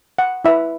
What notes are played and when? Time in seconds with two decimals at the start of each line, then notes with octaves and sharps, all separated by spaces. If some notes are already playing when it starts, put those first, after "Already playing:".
0.19 F#5
0.45 E4 B4 E5